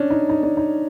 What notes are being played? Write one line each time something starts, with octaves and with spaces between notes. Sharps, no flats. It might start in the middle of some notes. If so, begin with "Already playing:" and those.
Already playing: C#4 D4
D#4
D#4
D4
D#4